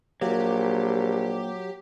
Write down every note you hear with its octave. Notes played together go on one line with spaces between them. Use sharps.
A#1 F#3 A#3 G4